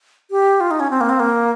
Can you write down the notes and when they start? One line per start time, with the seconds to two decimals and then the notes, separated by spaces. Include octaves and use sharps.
0.31 G4
0.60 F4
0.71 D#4
0.80 C#4
0.90 C4
1.01 A#3
1.09 C4
1.20 A#3